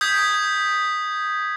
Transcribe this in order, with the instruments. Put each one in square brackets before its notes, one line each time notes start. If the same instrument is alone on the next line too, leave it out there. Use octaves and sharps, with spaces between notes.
[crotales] D#6 G6 G#6 B6